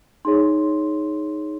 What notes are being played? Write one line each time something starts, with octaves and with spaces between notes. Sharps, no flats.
D#4 G#4 C#5 C6